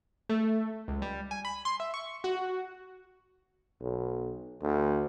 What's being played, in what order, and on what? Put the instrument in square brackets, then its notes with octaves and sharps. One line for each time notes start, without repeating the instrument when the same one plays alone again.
[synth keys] A3
C#2
G3
G#5
B5
C6
E5
C#6
F#4
[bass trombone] B1
D2